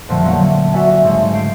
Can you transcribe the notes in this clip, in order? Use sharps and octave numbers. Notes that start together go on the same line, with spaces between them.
F2 A#2 D3 F3 A3 C4
D3 F#3 A3 A#3 D4
F#4 D5 E5 G#5
G#2 C#3 G#3 A3
G6 C7 D7